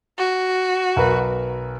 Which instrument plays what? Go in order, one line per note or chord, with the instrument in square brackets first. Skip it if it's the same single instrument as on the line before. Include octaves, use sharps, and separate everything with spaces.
[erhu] F#4
[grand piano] B1 A#4 B4